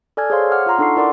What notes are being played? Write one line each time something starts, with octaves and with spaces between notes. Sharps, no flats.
A4 D5 G#5 F6 G#6
G#4 C5 C#5 F5 C6
F#5 D6 F6
F4 F#5 A#5 C6
D4 D#4 A4 F#5 C#6 C7
E4 A#4 D5 F#5 C6 D6